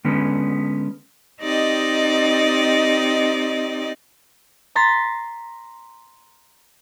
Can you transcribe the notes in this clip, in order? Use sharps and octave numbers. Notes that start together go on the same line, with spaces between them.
D3 G#3 B3 C#4
C4 D#4 G4 D5 D#5
A#5 C6 A6 B6